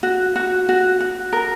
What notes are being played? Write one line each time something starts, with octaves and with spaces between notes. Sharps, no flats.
F#4
F#4
F#4
F#4
A#4